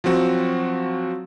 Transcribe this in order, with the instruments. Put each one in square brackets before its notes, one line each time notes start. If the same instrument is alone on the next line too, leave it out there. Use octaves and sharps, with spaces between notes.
[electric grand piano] F3 F#3 C4 F#4